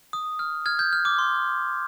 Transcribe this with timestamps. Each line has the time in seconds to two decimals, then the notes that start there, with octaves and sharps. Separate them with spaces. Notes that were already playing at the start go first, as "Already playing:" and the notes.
0.13 D#6
0.39 F6
0.66 F6 G#6
0.79 G6
0.93 F6
1.05 D6
1.18 C6